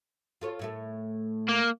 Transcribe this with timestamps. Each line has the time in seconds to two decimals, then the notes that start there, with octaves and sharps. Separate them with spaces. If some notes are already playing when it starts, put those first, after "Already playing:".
0.41 F4 A4 C#5
0.59 A2 A3 A4
1.49 A#3